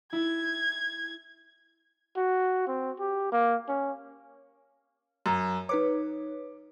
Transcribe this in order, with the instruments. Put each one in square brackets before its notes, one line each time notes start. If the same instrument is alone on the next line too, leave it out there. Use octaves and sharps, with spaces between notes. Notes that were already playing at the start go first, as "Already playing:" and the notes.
[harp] E4 [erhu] G#6
[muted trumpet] F#4
C4
G4
A#3
C#4
[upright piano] F#2 [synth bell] A#5
[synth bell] D#4 B4 C#5 [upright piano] D6